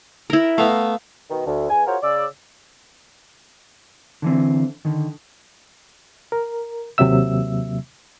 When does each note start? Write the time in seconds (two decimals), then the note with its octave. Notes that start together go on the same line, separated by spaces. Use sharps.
0.30 E4 A#4
0.58 A3 B3 F5
1.30 B2 D#3
1.46 D2
1.70 E2 G#5
1.87 F4 F#4 G#4 A#4 C5 C#5
2.03 C#3 D5 E6
4.22 D3 E3 C4
4.85 D3 D#3
6.32 A#4
6.98 D#2 C3 F#3 A#3 E5 E6